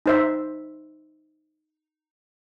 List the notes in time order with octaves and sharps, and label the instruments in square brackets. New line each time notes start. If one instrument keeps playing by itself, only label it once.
[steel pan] D#4 C5 E5